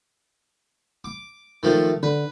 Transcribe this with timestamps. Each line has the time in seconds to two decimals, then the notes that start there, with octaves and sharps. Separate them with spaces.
1.04 D6
1.63 D#3 F3 A3
2.03 D3 B4